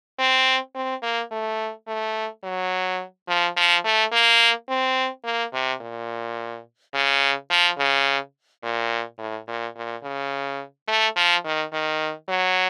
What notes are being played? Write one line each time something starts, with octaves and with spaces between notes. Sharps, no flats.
C4
C4
A#3
A3
A3
F#3
F3
F3
A3
A#3
C4
A#3
C3
A#2
C#3
F3
C#3
A#2
A2
A#2
A#2
C#3
A3
F3
D#3
D#3
F#3